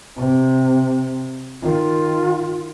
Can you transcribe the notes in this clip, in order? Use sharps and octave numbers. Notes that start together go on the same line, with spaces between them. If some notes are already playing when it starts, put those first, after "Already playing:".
C3
D#3 F4